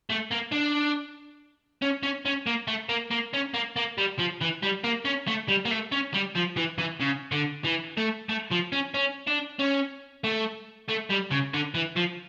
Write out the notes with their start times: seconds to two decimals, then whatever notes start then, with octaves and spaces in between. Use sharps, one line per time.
0.10 A3
0.31 A#3
0.52 D4
1.82 C#4
2.03 C#4
2.25 C#4
2.46 A#3
2.67 A3
2.89 A#3
3.11 A#3
3.33 C#4
3.54 A#3
3.76 A#3
3.98 G3
4.19 F3
4.41 E3
4.63 G3
4.84 A#3
5.05 C#4
5.27 A3
5.48 G3
5.65 A#3
5.71 A3
5.92 C#4
6.14 G3
6.35 F3
6.56 E3
6.78 E3
7.00 C#3
7.32 D3
7.64 E3
7.98 A3
8.29 A3
8.51 F3
8.72 C#4
8.94 C#4
9.27 D4
9.59 C#4
10.24 A3
10.89 A3
11.10 G3
11.31 C#3
11.54 D3
11.75 E3
11.97 F3